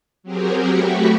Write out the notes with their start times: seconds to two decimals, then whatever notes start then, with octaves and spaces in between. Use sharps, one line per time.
0.23 F#3 C4 G4 G#4 A#4
0.69 A3 F#4 G4 B5 C#6